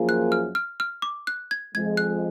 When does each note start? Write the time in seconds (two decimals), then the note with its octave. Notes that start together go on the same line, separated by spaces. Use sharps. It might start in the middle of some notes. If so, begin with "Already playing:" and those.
Already playing: F#2 F3 A#3 F4 G#4
0.09 F#6
0.32 F6
0.55 F6
0.80 F6
1.02 D6
1.27 F#6
1.51 G#6
1.74 F2 F3 G#3 G#6
1.97 F#6